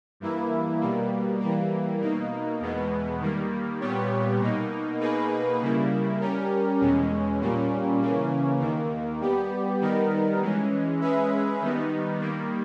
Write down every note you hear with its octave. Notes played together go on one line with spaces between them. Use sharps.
G2 E3 A#3 E4
B2 G3 A#3
E3 G3 A#3
B2 A#3 D#4
E2 B2 G#3 B3
D#3 G3 A#3
A#2 G3 B3 G4 C#5
B2 A#3 D#4
B2 A#3 D#4 G#4 B4
C#3 G3 A#3 E4
G3 C#4 G4 A#4
E2 B2 G#3 C#4
A#2 G3 A#3 C#4
C#3 E3 A#3 C#4
D#2 D#3 A#3
G3 B3 G4
D#3 G3 B3 D#4 A#4
E3 G#3 C#4
G#3 C#4 G#4 B4 E5
D#3 G3 B3 D#4
D#3 G3 A#3